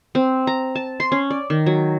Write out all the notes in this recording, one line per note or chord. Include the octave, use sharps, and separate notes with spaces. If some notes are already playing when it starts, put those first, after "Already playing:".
C4
A#5
A5
C6
C#4
D5
D#3
F#3